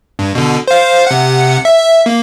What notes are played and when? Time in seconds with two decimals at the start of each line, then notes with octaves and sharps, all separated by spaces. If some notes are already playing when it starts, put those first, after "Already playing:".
0.19 G2
0.35 B2 D3
0.68 C5 F5
1.07 C3 F#5
1.65 E5
2.06 A#3